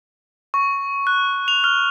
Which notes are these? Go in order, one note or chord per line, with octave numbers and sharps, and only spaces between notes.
C#6
F#6
F7
F6